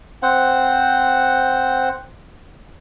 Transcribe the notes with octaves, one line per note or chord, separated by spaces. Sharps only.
C4 C5 F#5